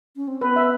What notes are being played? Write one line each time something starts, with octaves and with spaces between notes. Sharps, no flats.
C#4
C4
B3 B4
E5